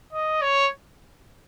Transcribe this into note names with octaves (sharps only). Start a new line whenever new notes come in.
D#5
C#5